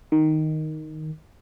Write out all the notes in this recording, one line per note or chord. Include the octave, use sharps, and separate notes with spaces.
D#3